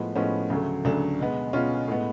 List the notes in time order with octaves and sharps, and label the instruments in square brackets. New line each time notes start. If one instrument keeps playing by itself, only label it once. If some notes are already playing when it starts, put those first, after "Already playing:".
Already playing: [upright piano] A2 F3 G#3 B3
A2 F3 G#3 B3 C#4
D2 C#3 F#3 A3
D2 C#3 F#3 A3 D4
B2 G#3 B3
B2 G#3 B3 C#4 F4
A2 G#3 B3